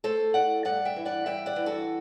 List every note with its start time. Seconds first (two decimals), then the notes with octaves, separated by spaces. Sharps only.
0.04 A3 A4 C5
0.34 E3 D5 F#5
0.65 G2 D5 F#5
0.85 E5 G5
0.96 E3
1.05 D5 F#5
1.26 G2 E5 G5
1.46 D5 F#5
1.56 E3
1.66 F#4 A4